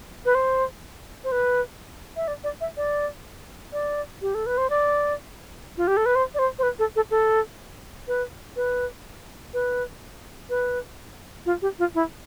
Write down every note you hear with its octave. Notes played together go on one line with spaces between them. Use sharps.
B4
C5
C5
B4
E5
D5
D5
E5
D5
D5
G4
A4
B4
C5
D5
F4
G4
A4
B4
C5
D5
C5
C5
B4
A4
A4
A4
B4
B4
B4
B4
F4
G4
F4
E4